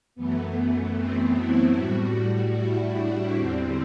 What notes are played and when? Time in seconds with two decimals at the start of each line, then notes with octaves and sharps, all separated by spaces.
0.15 F#2 E3 A3 B3
0.95 C4
1.35 E4
1.74 A2 G3 F#4
2.54 E4
2.94 D4
3.34 E2 D3 G3 C4